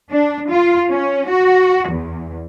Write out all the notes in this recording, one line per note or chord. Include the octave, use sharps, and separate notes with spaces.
D4
F4
C#4
F#4
E2